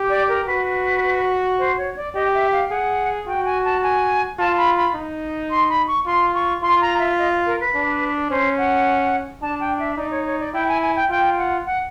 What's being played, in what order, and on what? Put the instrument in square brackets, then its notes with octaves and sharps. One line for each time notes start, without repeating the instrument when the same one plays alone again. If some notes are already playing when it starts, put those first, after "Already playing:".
Already playing: [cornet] G4
[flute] D5
A#4
[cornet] F#4 [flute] B4
[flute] C5
C#5
D5
[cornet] G4 [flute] D#5
[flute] E5
F5
[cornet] G#4 [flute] F#5
[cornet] F#4 [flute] G5
[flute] G#5
A5
G#5
[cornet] F4 [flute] A5
[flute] B5
B5
[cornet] D#4
[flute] C6
B5
C#6
[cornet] F4 [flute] C6
[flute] C#6
[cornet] F4 [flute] C6
[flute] A#5
E5
D#5
A#4
B4
[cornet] D4
[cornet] C#4 [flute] C5
[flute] F#5
[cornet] D4 [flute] A5
[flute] G5
E5
[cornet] D#4 [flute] D5
[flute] C#5
C#5
D5
[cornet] E4 [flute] G5
[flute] G#5
G#5
G5
[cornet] F4 [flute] G5
[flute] F#5
F#5